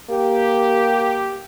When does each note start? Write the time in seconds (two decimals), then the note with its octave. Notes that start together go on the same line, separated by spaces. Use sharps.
0.10 A#3 G4